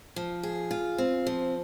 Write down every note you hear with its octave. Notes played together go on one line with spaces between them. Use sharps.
F3
G#4
F4
C4
F3